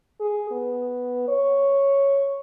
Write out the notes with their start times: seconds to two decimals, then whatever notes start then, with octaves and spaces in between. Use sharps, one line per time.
0.20 G#4
0.51 B3
1.28 C#5